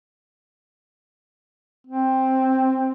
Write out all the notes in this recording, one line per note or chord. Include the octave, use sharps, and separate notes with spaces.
C4